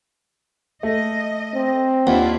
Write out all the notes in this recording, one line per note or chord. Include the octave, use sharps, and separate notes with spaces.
A3 D#5
C4
D#2 D4 E4 F4 F#5